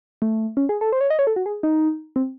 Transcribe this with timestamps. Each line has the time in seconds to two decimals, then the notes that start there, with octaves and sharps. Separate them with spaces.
0.22 A3
0.57 C#4
0.69 G#4
0.81 A4
0.92 C5
1.01 C#5
1.10 D#5
1.19 C#5
1.27 A4
1.36 F#4
1.46 G#4
1.63 D#4
2.16 C4